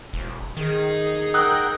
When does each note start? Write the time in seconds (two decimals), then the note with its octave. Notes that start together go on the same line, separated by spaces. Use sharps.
0.13 E1
0.57 D#3 D#4 G#4
1.34 A#4 F#5 G5 D#6 E6 F#6